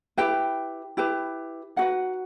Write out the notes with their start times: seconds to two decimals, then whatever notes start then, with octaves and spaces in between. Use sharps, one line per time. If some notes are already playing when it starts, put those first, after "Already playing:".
0.17 E4 G4 B4 G5
0.97 E4 G4 B4
1.76 D#4 F#4 B4 F#5